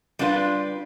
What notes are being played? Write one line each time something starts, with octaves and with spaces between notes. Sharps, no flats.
G3 D4 F4 B4